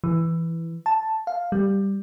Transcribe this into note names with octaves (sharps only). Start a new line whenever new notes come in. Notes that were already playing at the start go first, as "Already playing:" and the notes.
E3
A5
F5
G3